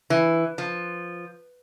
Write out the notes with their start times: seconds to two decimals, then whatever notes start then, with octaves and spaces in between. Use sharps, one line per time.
0.10 E3
0.58 F3